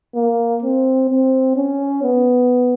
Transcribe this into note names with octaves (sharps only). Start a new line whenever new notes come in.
A#3
C4
C4
C#4
B3